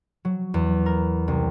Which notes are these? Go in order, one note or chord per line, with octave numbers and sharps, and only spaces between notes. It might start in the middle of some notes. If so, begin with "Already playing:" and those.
F#3
E2
A#4
C2